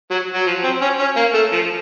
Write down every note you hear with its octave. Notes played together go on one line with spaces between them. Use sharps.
F#3
F#3
F3
C4
C#4
C#4
A#3
A3
F3